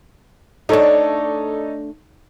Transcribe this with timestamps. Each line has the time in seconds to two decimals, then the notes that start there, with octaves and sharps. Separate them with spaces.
0.69 A3 D4 D#4 A4 C#5